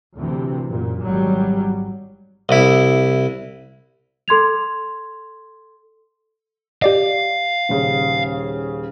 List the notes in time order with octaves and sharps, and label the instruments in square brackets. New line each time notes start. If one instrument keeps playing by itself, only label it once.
[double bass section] D2 C3 E3
F#2 A#2
G#1 F#3 G3
[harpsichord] C2 E4
[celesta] A4 C6 G#6 F7
[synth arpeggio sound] G4 D5 D#5 [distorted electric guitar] F5
[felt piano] D#1 C#3